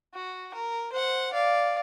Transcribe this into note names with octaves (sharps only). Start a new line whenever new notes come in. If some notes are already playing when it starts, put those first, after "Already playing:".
F#4
A#4
C5 F#5
D5 F5